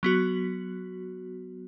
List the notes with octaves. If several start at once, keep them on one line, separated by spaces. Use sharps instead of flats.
F#3 B3 F#4